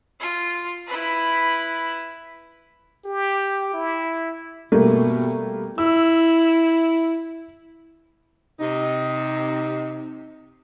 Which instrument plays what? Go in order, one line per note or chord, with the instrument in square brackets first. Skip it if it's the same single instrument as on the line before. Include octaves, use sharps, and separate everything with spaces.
[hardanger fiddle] F4
E4 B4
[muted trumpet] G4
E4
[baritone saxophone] B2 [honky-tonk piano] G3 A3 A#3
[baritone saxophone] E4 [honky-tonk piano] E6
[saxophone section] C3 D#4